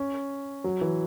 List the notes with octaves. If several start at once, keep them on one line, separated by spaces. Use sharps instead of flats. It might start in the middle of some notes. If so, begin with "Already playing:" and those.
Already playing: C#4
F#3
E3